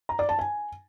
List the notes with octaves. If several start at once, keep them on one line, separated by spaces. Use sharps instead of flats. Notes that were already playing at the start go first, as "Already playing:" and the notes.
A#5
D5
A5
G#5